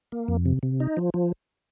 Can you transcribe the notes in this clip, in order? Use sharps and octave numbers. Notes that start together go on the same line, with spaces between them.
A#3
F2
C3
C3
D#4
F3
F3